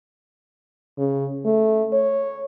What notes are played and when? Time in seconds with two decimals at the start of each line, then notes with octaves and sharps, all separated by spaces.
0.98 C#3
1.45 A3
1.93 C#5